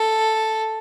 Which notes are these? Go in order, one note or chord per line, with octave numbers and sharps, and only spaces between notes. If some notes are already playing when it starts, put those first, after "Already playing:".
Already playing: A4